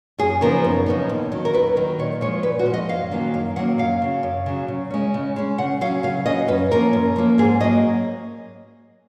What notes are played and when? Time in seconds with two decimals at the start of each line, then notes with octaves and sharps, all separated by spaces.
0.18 F#2 G#4
0.41 C#3 F3 B3 D#4 A#4
0.64 F#2
0.86 C#3 F3 B3 D#4
1.09 D#2
1.32 D#3 F#3
1.45 A#4
1.53 D#2 B4
1.76 D#3 F#3
1.99 A#2 C#5
2.21 F3 G#3 C#5
2.43 A#2 B4
2.59 F#4
2.66 F3 G#3
2.74 D#5
2.88 F#2 F5
3.11 D#3 F#3 A#3 C#4
3.34 F#2 F5
3.56 D#3 F#3 A#3 C#4 F#5
3.78 F#2 F5
4.02 C#3 F#3
4.23 F#2
4.46 C#3 F#3
4.68 C#3
4.91 G#3 C#4
5.14 C#3
5.36 G#3 C#4
5.58 C#3 F#5
5.81 F#3 F5
5.86 C#4
6.03 C#3 F5
6.26 F#3 C#4 D#5
6.48 F#2 B4
6.71 F3 A#3 C#4 A#4
6.93 F#2
7.16 F3 A#3 C#4
7.38 G#2 G#4
7.60 F#3 D#5
7.64 A#3